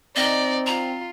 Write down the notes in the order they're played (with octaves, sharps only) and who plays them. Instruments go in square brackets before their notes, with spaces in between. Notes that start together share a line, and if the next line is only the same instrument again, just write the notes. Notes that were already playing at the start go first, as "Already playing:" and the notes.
[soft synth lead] C4 [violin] D#4 D5 [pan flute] D#5
[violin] F4 [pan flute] A#5